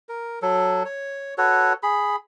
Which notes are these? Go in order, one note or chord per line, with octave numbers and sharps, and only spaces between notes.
A#4
F#3 A4
C#5
F#4 A4 B4 C#5
G#4 B5